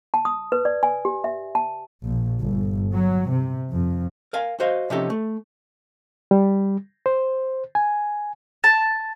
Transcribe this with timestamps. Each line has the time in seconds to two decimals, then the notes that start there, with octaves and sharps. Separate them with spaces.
0.14 A5
0.25 D#6
0.52 B4
0.65 D5
0.83 G#5
1.05 G4
1.24 E5
1.55 A5
2.05 A#1
2.41 G1
2.93 F#3
3.31 C3
3.72 F2
4.33 A#4 F5 G#5
4.60 F#4 C5 D#5 F5
4.90 C3 F3 C#4 D#4 G4 A4
5.10 A3
6.31 G3
7.06 C5
7.75 G#5
8.64 A5